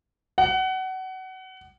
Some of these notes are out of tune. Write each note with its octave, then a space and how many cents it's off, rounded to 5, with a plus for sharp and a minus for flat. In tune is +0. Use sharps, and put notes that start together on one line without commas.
F#5 +25